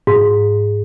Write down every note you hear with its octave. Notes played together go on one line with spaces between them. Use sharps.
G#2